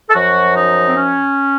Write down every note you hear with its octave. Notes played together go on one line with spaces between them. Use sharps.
A4
F#2 F3 F#4
D#4
C4
C#4